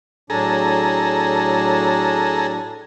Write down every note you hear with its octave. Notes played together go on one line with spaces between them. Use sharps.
A2 F#3 D4 G#4 A4 A#5